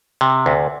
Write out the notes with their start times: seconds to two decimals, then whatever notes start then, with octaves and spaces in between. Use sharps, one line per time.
0.21 C3
0.46 D2